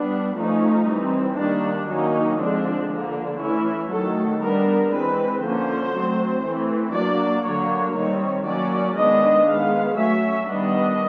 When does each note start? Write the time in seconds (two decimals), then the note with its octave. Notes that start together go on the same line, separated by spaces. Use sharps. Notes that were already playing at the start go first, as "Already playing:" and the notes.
Already playing: G3 B3 D4
0.36 F3 A3 C#4 D#4
0.87 E3 G3 C4
1.37 D#3 G3 A#3 D4
1.88 D#3 F#3 A#3 C#4 D#4
2.39 D3 F3 G#3 C4 D4
2.89 D3 F3 A#3 D4
3.40 E3 A3 C#4 E4
3.91 D#3 F#3 A3 A4
4.41 G3 B3 D4 A#4
4.92 E3 G#3 C4 B4
5.42 D3 F3 A#3 C#4 C5
5.93 F#3 A3 C4
6.43 E3 A3 C4
6.94 F#3 A#3 D4 D5
7.44 D3 F#3 A#3 D4 C#5
7.95 D#3 G3 C4 C#5
8.46 F#3 A#3 C#4 D5
8.96 D#3 G#3 B3 D4 D#5
9.47 D#3 G#3 B3 F5
9.98 F#3 A3 C#4 E5
10.48 D#3 G3 B3 D4 D#5